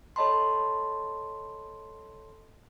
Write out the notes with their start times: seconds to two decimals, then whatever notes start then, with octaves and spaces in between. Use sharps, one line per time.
0.16 A4 C#5 D#5 A5 B5 C6